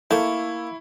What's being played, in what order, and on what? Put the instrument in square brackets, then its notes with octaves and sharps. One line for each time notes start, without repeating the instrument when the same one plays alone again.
[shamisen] A3 A#4 [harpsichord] A#3 A5 [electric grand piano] E4 C#6